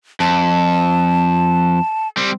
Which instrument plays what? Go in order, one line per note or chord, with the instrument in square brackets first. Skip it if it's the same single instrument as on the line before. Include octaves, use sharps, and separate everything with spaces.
[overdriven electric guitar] F2 [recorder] A5
[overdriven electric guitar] G3 C4